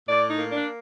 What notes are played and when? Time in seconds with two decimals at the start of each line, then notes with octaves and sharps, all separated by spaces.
0.08 A2 D5
0.30 D#4
0.38 A#3
0.52 D4